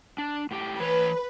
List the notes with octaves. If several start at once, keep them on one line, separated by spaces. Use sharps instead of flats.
D4
A2 G4
E3 B4 C#5